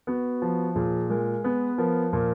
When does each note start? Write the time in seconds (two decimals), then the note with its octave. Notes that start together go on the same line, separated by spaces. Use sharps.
0.07 B3 F#4
0.42 F3
0.75 A#2 G#4
1.10 G#3 A#4
1.44 B3 B4
1.78 F3 A#4
2.13 A#2 A#4